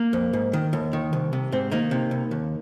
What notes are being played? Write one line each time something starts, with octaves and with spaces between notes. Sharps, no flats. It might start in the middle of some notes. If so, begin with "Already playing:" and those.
Already playing: A#3
F2
G#2
D#3
D#2
D#3
C2
C3
G#2 C4
D#3 A#3 D#4
C3
C2
D#2